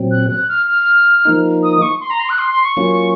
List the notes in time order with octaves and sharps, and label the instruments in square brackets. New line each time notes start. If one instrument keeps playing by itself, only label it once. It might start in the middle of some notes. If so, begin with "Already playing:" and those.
Already playing: [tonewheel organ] A#2 F#3 C4
[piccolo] F#6
F#6
F6
F6
[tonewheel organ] F3 A#3 D#4
[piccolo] D#6
D#6
C#6
C6
A#5
C6
F#6
C6
C6
C#6
[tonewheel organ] F#3 A#3 C#4 F4